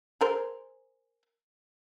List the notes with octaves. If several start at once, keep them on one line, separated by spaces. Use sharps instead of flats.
G#4 A#4 C5